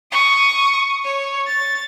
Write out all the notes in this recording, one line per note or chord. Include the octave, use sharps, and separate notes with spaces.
C#6 D#6
C#5
A6